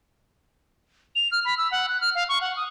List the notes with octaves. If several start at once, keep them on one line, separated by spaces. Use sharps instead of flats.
F7
F6
B5
E6
F#5
F#6
F6
F5
C#6
F#5
D#6